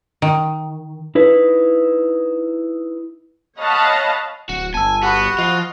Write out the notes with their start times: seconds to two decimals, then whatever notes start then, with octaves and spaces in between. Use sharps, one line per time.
0.22 D#3
1.15 D#4 E4 B4
3.59 C#5 D#5 F5 F#5 A5 B5
4.49 D1 F#4
4.74 G1 G#5 A5 E6
5.03 B3 F#4 G4 F#5 B5
5.38 F3 F4 D#5